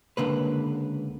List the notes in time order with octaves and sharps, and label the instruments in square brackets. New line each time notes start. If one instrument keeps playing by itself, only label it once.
[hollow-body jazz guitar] C#2 D3 A#3 B4